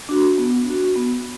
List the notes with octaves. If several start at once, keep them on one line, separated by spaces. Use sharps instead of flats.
D4 F#4
B3
D4 F#4
B3